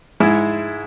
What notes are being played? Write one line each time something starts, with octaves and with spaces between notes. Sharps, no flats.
G#2 G#3 E4